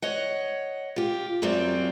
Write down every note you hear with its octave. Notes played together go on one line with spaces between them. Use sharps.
C#5 D#5 F#5
F4 G4
F#2 F#3 G3 C4 F4